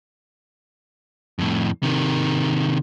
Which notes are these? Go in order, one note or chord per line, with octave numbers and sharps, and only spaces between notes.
F2 A2
C3 D#3